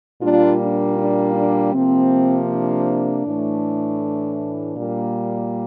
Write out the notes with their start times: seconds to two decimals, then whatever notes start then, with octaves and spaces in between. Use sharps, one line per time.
0.21 A#2 G3 A#3 D4 F4
0.60 D4
0.97 D4
1.35 D4
1.74 C3 F3 A#3 C4
2.49 D4
3.26 A2 E3 A3
4.76 A#2 G3 A#3